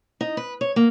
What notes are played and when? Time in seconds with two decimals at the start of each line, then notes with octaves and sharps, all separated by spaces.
0.21 D#4
0.37 B4
0.61 C#5
0.76 A#3